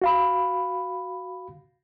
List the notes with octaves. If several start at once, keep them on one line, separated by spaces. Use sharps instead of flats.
F#4 F5 B5